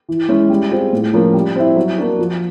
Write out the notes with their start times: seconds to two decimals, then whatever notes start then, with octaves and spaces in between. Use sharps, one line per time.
0.09 E3
0.29 G#3 C#4 E4
0.50 G3
0.71 C4 F4 G#4
0.93 A2
1.13 F3 A#3 C#4
1.34 G3
1.56 C4 E4
1.76 F#3
1.98 A#3 D4 F#4
2.19 F3